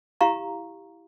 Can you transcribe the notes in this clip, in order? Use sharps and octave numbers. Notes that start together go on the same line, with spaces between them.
E4 G4 F5 A#5 C#6